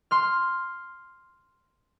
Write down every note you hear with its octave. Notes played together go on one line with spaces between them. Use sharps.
C6 F6